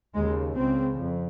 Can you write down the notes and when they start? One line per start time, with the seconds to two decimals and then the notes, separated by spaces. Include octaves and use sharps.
0.14 D#2 C#3 G#3
0.56 C#2 C#3 C4
0.97 F2